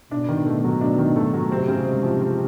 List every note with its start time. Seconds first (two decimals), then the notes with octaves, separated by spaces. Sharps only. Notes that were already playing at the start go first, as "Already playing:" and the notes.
0.11 B2 D4
0.28 D#3
0.46 A3
0.64 F#3
0.81 D4
0.98 D#3
1.16 A3
1.33 F#3
1.51 C3 C4
1.68 C#3
1.86 G#3
2.03 F3
2.21 C4